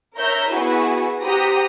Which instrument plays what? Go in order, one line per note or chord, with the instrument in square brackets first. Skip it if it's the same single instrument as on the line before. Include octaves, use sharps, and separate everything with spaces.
[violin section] A#4 C#5 E5 A#5 G6
B3 E4 F#4 G#4 B4
G4 C5 F#5 A#5 D#6